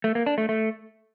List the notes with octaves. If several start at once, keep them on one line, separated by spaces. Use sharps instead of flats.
A3
A#3
D4
A3
A3